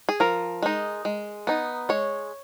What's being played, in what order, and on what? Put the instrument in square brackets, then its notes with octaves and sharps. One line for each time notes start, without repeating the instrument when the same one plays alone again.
[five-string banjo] G#4
F3 A#4
G#3 D#4
G#3
B3 D#4
G#3 C#5